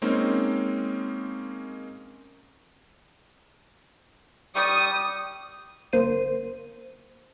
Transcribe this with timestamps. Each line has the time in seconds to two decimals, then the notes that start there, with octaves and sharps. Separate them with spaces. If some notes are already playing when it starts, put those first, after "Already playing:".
0.02 G#3 A#3 C4 C#4 D#4
4.55 G3 G4 C#6 D#6
5.93 G1 A#3 C5 D#7